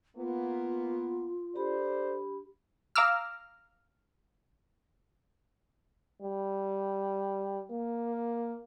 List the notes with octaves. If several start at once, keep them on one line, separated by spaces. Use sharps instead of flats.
A#3 B3 F4
D4 G4 A4 C5 D5 B5
F5 A#5 D6 E6 F6
G3
A#3